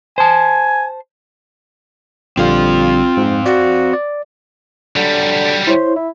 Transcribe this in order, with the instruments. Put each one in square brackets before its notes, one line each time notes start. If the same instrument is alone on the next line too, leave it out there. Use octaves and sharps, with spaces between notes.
[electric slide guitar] C5 A5 [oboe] G#5
[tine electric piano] A#1 D3 G3 [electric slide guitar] C4 F5 [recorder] F4
[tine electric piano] G#2
[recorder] F#4 [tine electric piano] D5
[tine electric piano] D5
[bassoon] D3 [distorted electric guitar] F#3 G3
[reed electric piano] E4 C#5 [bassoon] C5
[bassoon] E4